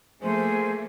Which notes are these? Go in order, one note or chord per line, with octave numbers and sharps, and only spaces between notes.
F3 A3 A#3 G#4 C5 G#5